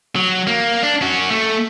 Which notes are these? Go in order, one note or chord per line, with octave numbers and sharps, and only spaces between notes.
F#3
A#3
D4
C#4 F#4
A3